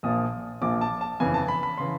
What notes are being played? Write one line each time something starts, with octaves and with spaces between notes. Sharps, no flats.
A#1 A#2 F3 D#6
A#1 A#2 F3 D6
A5
A5
G1 F2 C#3 E3 G#5
A5
B5
B5
C#3 E3 C6